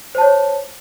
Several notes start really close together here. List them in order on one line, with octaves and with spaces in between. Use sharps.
C5 A5 C#5